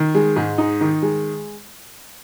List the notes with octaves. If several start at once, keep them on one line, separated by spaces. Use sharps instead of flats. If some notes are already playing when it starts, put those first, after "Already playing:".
Already playing: D#3
G#3
G#2
D#4
D#3
G#3